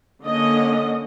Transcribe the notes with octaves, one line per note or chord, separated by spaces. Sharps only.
D3 A#3 C#4 D#5